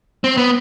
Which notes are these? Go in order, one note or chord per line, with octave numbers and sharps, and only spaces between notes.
C4
B3